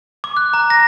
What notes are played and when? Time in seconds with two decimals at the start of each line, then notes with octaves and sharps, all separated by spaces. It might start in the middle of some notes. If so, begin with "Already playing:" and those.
0.24 D6
0.37 F#6
0.53 A#5
0.70 A#6